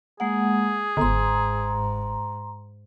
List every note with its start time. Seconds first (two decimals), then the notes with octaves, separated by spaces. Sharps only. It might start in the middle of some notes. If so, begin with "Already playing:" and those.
0.20 G#3 A#3 G#4 F#5
0.97 G1 G#2 A#5 C6